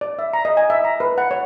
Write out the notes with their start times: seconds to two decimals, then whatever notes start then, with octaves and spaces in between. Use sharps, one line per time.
0.01 D5
0.19 E5
0.33 A#5
0.45 D#5
0.57 G#5
0.70 E5
0.84 A#5
1.00 B4
1.18 F#5
1.31 C#5